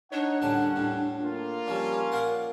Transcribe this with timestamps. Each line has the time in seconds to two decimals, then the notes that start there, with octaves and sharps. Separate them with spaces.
0.12 D4 D#4 C#5 F#5
0.42 D#2 A2 D3 G3 C#4 A5
0.76 A2
1.21 A#3 F4
1.68 F3 G3 C#4
2.12 A#4 D5 F5 F#5